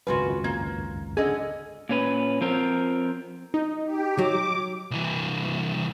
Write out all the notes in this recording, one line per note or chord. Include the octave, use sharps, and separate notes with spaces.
G#1 C#2 F#2 C#4 F4 F#4 B4
A#3 G#6
D3 C#4 G#4 A4 D#5
A#2 C#4 B4
F3 C4 A#4
D#4
G4
F#3 D6
C2 E3